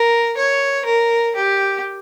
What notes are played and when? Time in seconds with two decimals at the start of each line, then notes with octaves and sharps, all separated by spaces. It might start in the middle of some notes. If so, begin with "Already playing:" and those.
Already playing: A#4
0.37 C#5
0.86 A#4
1.36 G4